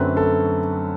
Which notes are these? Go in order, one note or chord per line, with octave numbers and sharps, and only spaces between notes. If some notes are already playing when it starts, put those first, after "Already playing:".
Already playing: F#2 D3 F#3 A3 C4 B4
A4